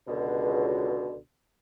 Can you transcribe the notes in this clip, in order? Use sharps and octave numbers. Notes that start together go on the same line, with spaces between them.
C#2 B2 D3